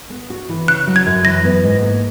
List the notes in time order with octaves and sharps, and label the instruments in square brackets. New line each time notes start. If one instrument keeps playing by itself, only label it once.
[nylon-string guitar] B3
F#4
E3
[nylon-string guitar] C#3 [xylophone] F#6
[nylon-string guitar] F#3
[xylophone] G#6
[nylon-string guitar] F#2
[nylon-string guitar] E3 [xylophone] A#6
[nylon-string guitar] B3
G#2
A#3